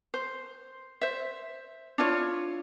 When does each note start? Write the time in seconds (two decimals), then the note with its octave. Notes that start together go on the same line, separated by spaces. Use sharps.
0.14 C5
1.01 C5 E5
1.98 D4 E4 F4 C#5